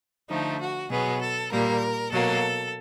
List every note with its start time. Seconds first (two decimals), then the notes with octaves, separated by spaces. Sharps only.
0.29 D3 F3 A3 D#4
0.61 F#4
0.90 B2 F#3 B3 G#4
1.21 A4
1.51 A#2 G3 A#3 A#4
2.12 B2 F#3 A#3 A4